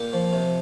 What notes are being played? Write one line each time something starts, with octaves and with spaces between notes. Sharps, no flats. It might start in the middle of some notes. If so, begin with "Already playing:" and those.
Already playing: A#2 G4
F3
C3